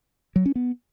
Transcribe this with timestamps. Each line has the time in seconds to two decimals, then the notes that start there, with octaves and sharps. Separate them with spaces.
0.36 F#3
0.46 C#4
0.56 B3